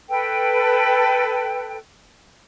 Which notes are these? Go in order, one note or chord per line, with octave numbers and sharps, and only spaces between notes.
A4 B4 G5